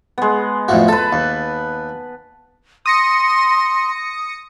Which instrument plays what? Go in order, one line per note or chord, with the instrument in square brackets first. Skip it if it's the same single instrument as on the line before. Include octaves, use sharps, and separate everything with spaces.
[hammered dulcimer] G#3 B3
[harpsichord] F2 A2 F#4
[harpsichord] A4 [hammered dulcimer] B4 A5
[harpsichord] D#2
[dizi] C6 [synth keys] D#6 A#6 C#7